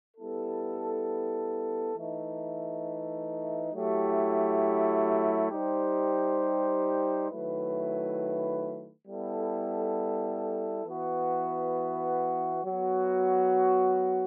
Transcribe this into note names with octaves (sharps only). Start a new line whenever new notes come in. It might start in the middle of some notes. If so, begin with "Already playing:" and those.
G3 B3 E4 A4
E3 A3 D#4
F#3 A3 E4 G4
G3 D#4 G4 C5
D#3 F#3 A3 E4 B4
G3 B3 E4 A4
E3 B3 F#4
F#3 B3 F#4